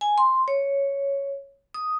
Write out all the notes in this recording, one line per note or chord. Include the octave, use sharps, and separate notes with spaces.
G#5
C6
C#5
D#6